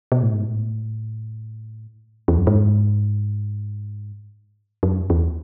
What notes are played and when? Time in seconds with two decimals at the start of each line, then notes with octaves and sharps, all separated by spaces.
0.12 B2
0.23 A2
0.34 G#2
0.45 A2
2.28 E2
2.38 F#2
2.47 G#2
4.83 F#2
5.10 E2